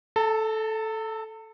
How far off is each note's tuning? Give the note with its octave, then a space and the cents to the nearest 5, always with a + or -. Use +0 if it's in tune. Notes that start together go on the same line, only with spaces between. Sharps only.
A4 -10 A5 +45